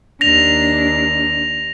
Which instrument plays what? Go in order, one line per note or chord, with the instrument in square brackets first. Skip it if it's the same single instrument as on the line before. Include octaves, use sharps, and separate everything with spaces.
[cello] D#2 D4 [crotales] A#6 F7